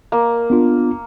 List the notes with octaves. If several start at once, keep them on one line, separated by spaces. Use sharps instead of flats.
A#3
B3 D4 F4